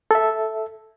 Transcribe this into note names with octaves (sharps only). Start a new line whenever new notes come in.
A4 E5